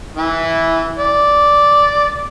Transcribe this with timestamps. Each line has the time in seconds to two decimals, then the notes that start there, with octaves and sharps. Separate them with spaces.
0.17 E3 E4
0.99 D5